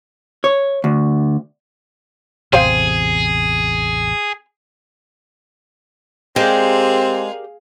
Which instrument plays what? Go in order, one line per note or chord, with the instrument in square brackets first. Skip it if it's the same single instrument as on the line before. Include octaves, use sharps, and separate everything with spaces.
[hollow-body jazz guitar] C#5
D2
[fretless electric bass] A1 E2 C3 [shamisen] C4 C5 F5 [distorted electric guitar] G#4
[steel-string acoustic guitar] G#3 [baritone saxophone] C4 [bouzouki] G4 A#4 D5 [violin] G#4 F5